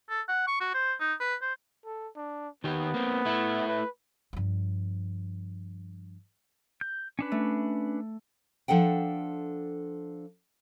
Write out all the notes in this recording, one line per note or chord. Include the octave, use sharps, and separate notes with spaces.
A4
F#5
C#6
F#4
C5
D#4
B4
C5
A4
D4
D#3 B3 G4
A#3 C4
A3 E4
B4
G2 F3
G6
C#4 D4 B4
A3
F3 D4 A4 F#5 G5